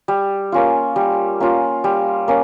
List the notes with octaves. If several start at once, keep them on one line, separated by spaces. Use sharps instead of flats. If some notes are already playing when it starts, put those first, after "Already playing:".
G3
A#3 C#4 F4
G3
A#3 C#4 F4
G3
A#3 C#4